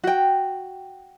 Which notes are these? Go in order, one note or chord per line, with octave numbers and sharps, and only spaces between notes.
F#4 G5